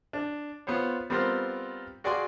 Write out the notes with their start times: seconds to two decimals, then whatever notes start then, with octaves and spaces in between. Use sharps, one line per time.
0.13 D4
0.67 B3 F4 C5 C#5
1.10 G3 B3 C4 F4 A#4 C5
2.04 F#4 G#4 D5 F5 G#5 C6